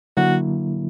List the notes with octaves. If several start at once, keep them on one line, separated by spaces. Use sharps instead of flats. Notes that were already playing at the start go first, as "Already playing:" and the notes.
D3 F#3 A#3 E4 F#4